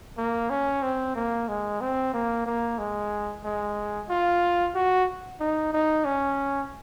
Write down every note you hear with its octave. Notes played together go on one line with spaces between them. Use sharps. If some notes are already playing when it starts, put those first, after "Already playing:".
A#3
C#4
C4
A#3
G#3
C4
A#3
A#3
G#3
G#3
F4
F#4
D#4
D#4
C#4